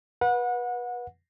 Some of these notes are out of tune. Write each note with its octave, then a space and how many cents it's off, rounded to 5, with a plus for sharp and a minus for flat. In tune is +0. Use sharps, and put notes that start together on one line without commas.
B4 -25 F#5 -30